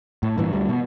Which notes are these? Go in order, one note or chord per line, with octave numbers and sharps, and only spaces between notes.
A2
G2 A#2 E3
D2 G3
B2